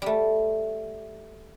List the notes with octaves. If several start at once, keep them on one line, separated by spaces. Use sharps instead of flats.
G3 A3